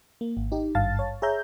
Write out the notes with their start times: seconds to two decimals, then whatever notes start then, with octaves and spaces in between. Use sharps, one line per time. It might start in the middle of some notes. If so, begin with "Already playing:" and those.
0.21 A#3
0.37 G#1
0.52 D#4 G4
0.75 G#1 G2 F5 A5 A6
0.99 C#5
1.22 G#4 C#5 E5 A#5 G6